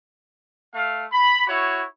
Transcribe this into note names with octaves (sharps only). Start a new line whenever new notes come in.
A3 F5
B5
E4 F#4 C#5